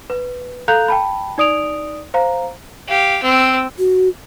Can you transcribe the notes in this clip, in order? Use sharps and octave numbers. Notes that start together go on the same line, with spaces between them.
B4
A4 F5 A#5 F#6 G6 F7
G5 A5 B5
D#4 D5 D#6 D7 F7
C5 F5 A#5
G4 F5
C4 E6
F#4